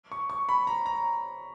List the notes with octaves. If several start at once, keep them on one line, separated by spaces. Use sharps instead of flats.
C#6
C#6
B5
A#5
A#5